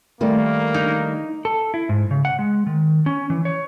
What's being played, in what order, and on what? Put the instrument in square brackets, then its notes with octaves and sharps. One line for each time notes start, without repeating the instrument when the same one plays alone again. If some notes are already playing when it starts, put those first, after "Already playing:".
[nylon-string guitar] D#3 G3 A3 [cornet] A#3
[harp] D#4
[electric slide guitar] A4
E4
G#2
C#3
F#5
G#3
D#3
C#4
E3
C#5